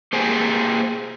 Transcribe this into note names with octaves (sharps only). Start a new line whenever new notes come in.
A#3 G4 G#4 C5 G5 G#5